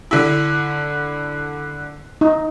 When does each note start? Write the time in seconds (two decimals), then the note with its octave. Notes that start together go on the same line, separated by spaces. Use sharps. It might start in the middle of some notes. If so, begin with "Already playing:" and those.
0.11 D3 E4
2.21 D#4